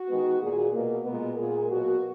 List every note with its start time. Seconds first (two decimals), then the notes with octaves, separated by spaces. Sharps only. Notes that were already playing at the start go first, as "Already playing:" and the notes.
Already playing: F#4
0.09 D#3 G#3 B3
0.41 A#2 A#3 G#4
0.73 B2 A#3
1.05 A#2 G#3 B3 A#4
1.38 A#2 A#3 G#4
1.70 B2 F#3 A#3 F#4